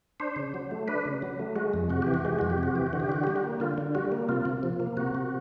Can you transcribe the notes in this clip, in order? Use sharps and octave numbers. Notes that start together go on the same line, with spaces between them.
D4 C5
C#3
F#3
A3
D4 B4
C#3
F#3
A3
G#3 F#4
F2
C3 F#4
E3 G4
F#4
G#3 G4
F2 F#4
G4
C3 F#4
E3 G4
F#4
D3
G4
D3 F#4
G3 G4
F#4
A#3
D3 F4
D3
G3 F#4
A#3
C3 F4
C3
F3
A#3
C3 F#4
C3